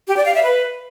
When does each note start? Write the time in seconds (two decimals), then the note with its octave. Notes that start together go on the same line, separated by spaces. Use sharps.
0.08 G4
0.17 D5
0.25 F5
0.34 E5
0.43 B4